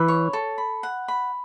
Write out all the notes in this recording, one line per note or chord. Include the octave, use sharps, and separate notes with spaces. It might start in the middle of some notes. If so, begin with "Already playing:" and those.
Already playing: E3 B5
C#5
A4
B5
F#5
B5